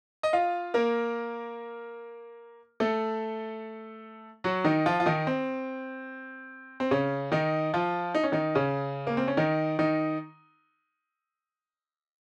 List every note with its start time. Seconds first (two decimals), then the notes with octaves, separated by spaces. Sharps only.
0.23 D#5
0.33 F4 F5
0.74 A#3 A#4
2.80 A3 A4
4.44 F#3 F#4
4.64 D#3 D#4
4.86 F3 F4
5.00 F4
5.06 D#3 D#4
5.27 C4
6.80 C4
6.91 C#3 C#4
7.32 D#3 D#4
7.74 F3 F4
8.14 D#4
8.23 C#4
8.32 D#3 D#4
8.55 C#3 C#4
9.07 A#3
9.17 C4
9.28 C#4
9.37 D#3 D#4
9.79 D#3 D#4